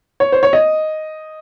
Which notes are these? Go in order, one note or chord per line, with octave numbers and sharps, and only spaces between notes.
C#5
C5
C#5
D#5